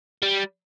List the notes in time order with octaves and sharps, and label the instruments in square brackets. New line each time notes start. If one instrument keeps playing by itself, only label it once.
[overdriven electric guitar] G3